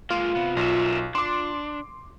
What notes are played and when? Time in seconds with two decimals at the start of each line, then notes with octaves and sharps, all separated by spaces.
0.10 G#3 A#3 F4
0.35 C3 B3
0.57 B1 A#4 E5
1.15 D4 C6 D6